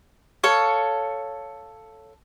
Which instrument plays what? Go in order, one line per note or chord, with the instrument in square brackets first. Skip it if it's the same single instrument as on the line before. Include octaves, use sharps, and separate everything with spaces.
[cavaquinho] A4 C#5 F5